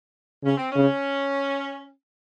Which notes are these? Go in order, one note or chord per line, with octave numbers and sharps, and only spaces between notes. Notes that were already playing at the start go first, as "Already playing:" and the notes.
C#3 C#4
C4
C#3 C#4